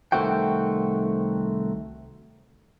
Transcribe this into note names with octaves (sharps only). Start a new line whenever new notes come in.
C2 D#3 A3 C4 F#4 G5